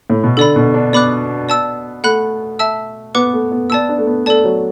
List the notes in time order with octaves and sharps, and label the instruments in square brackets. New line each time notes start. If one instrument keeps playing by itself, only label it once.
[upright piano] A2
B2
[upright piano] D3 [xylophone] A4 D5 B5
[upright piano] B2
D4
[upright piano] B3 [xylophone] D5 B5 D6 F#6
[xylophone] D5 A5 E6
[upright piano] A3 [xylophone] F#5 B5 F#6
[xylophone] E5 A5 E6
[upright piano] B3 [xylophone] B4 F#5 D6
[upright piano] A3
B3
[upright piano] B3 [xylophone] D5 A5 E6
[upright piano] D4
A3
B3
[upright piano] A3 [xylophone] A4 D5 A5
[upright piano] F#3